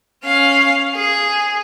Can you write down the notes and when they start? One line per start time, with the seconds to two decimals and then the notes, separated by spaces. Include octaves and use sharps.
0.25 C#4 F5
0.95 G#4